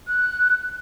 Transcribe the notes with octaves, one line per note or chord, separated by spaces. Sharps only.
F#6